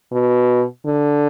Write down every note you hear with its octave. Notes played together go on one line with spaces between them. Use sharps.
B2
D3